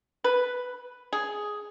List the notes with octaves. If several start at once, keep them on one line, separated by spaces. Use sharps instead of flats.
B4
G#4